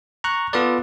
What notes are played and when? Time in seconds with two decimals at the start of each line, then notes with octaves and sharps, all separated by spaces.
0.24 A#5 C#6 F#6
0.53 B3 F4 A4 B4 D5